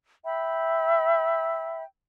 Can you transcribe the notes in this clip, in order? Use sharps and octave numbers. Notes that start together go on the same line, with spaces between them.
E5 G5 B5